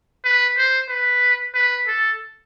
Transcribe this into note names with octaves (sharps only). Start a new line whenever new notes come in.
B4
C5
B4
B4
A4